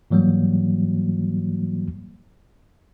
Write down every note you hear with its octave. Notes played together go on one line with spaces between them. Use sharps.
G#2 E3 F#3 G3 A#3